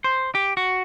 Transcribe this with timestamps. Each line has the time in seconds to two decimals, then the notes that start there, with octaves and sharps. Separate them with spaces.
0.04 C5
0.35 G4
0.57 F#4